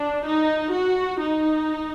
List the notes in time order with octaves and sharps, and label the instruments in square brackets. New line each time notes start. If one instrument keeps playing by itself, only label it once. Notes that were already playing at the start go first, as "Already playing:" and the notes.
Already playing: [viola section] D4
D#4
F#4
D#4